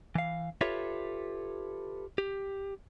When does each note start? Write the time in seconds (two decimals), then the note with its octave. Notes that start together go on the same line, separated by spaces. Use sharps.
0.15 E3 F5
0.61 F4 G4 A4 B4 C#5 E5
2.18 G4